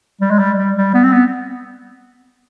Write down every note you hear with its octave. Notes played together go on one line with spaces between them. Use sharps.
G3
G#3
G3
G3
G3
B3
C4
B3